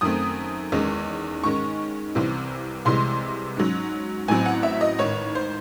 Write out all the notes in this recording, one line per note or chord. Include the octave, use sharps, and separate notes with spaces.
F#2 D#3 A3 C4 D#6
E2 D#3 G#3 C#4
G#2 D#3 G#3 C#4 C#6
C2 C3 E3 C4
C2 C3 E3 G#3 C6
G#2 F#3 C#4
A1 A2 F#3 C4 G#5
F#5
E5
D#5
A1 G#2 D#3 C#5
C5